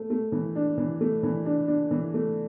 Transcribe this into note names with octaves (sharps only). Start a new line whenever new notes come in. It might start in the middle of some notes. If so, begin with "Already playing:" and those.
Already playing: A3
A3
E3
D4
E3
A3
E3
D4
D4
E3
A3